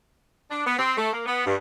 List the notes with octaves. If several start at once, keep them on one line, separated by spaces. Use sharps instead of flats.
D4
B3
C4
A3
A#3
B3
G2